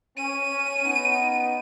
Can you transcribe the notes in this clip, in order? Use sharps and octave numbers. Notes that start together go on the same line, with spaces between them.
C#4 D#7
B3 D#4